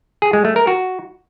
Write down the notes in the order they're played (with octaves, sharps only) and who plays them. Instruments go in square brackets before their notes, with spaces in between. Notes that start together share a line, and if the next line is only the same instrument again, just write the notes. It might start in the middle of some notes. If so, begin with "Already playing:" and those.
[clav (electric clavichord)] G#4
G#3
A3
A#4
F#4